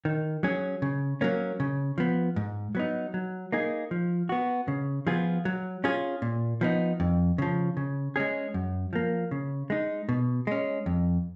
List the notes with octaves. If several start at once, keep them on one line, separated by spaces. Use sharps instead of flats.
D#3
F#3 C#4 G#4
C#3
F#3 A#3 C#4
C#3
F3 B3
G#2
F#3 B3 D#4
F#3
A#3 D#4 G#4
F3
B3 F#4
C#3
F3 B3 F4 G#4
F#3
C#4 F4 G#4
A#2
F3 B3 D#4
F2
C#3 F3
C#3
G#3 C#4 G#4
F#2
F3 A#3
C#3
G#3 D#4
B2
G#3 C#4
F2